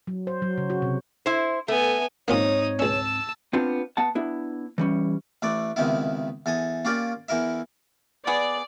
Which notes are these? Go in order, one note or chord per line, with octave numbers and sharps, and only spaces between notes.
F#3
C5
F#3
C#3
F#4
C3
E4 C5
A3 B3 G#5
G#2 A#3 C4 C#4 D#4 F4 C#5 D#6
C#2 C#4 A5 E6
B3 C4 D4 F4
B3 F#5 A5
B3 D4 E4
E3 G3 C#4
A1 A3 B4 D5
C#2 C3 D#3 B3 E4
E2 A4 G#5 D#6
A#3 C#4 F4 G4 D5
E2 E3 E4 A#4 E5
B3 G#4 D5